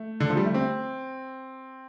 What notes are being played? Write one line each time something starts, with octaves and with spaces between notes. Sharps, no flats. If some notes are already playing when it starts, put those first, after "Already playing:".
Already playing: A3
D3
F3
G3
A3
C4